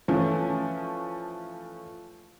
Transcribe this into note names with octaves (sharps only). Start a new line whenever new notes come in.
E3 F3 A3 C#4